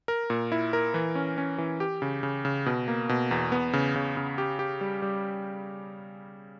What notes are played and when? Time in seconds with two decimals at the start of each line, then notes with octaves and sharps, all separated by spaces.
0.08 A#4
0.30 A#2
0.52 E4
0.73 A#4
0.94 E3
1.15 C#4
1.38 C#4
1.58 E3
1.80 G4
2.02 C#3
2.23 C#3
2.45 C#3
2.66 B2
2.88 A#3
3.09 B2
3.31 E2
3.52 B3
3.73 C#3
3.96 C#3
4.17 C#3
4.38 G4
4.59 G4
4.81 G3
5.02 G3